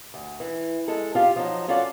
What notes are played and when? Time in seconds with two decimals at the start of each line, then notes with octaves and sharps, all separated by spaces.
0.14 D2
0.40 E3
0.88 G#3 A4
1.15 F4 G4 F5
1.36 F3 F#3 D#4
1.68 C#4 F4 F#4 A4 D5